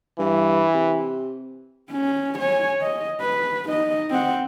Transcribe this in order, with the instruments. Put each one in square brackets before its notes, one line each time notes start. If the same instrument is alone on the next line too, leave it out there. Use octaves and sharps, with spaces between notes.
[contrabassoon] G2 [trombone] E3
[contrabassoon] C3
[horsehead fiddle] C#4
C#5 G#5
D#5
B4
D#4 D#5
C4 F#5